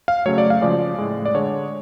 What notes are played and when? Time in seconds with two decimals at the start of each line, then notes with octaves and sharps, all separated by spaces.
0.08 F5
0.26 C#3 F#3 A3 C#5
0.38 D5
0.50 F5
0.61 C#3 F3 G#3 D5
0.98 A2 G#3
1.25 D5
1.34 D3 G#3 C#5